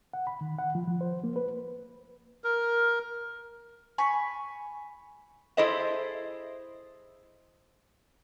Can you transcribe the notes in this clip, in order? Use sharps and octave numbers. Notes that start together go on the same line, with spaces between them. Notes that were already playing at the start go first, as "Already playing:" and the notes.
F#5
B5
D#3
F#5
F3
F3
C5
A#3
B4
A#4
G#5 B5 C#6
E4 G#4 A4 C5 D#5 E5